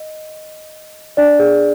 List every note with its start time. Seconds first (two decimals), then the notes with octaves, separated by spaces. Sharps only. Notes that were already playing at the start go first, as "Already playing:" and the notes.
Already playing: D#5
1.17 D4 D5
1.39 G#4